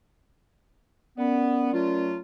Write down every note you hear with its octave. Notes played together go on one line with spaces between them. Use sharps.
B3 C#4 A#4 D5
F#3 A3 F4